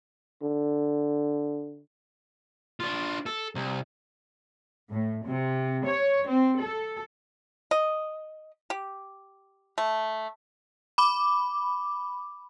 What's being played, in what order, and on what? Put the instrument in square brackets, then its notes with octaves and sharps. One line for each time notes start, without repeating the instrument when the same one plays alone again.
[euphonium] D3
[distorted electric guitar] D4 F4
A4
C2
[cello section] A2
C3
C#5
C4
A4
[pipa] D#5
G4
A3
[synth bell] B5 D6